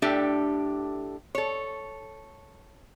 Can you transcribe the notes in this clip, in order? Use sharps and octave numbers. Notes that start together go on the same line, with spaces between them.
A2 D4 G4 A4 E5 G5
A4 C#5